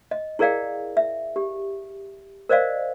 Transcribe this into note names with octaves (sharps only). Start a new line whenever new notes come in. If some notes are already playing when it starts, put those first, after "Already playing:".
D#5
E4 G#4 A#4 D5 F5 G5
E5
G4
A#4 C5 D5 D#5 F5